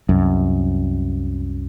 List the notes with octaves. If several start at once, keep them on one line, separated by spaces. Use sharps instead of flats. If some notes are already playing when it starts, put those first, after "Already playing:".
C2 F#2